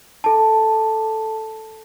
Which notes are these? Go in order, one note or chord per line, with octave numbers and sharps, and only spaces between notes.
A4 A5